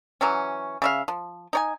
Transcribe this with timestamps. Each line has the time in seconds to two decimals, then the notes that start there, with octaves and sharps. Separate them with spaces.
0.21 E3 F#3 C#4
0.82 C#3 E5 F5
1.08 F3
1.53 D#4 C#5 G#5